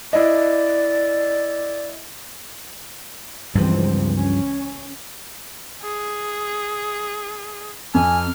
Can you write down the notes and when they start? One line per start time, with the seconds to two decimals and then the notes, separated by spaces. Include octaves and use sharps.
0.13 E4 D5 D#5
3.55 C#2 G2 E3 F3 C4
4.16 C#4
5.82 G#4
7.95 F2 G#5 F6